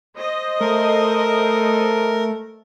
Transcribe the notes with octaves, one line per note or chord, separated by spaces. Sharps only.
C5 D#5
A3 A4 A#4